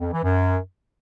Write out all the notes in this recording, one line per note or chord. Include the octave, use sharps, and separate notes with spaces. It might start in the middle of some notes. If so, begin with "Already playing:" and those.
F2
E3
F#2